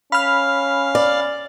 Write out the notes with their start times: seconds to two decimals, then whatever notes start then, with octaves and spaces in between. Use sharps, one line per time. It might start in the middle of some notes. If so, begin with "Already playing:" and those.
0.12 C#4 F5 B5 F6
0.95 D5